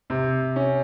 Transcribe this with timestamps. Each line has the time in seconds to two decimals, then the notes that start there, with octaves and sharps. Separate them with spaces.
0.10 C3
0.56 C#4